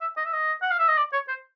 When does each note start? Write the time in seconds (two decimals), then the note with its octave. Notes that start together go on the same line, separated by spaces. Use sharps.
0.01 E5
0.17 D#5
0.25 E5
0.33 D#5
0.62 F#5
0.71 F5
0.79 E5
0.88 D#5
0.97 D5
1.13 C#5
1.28 C5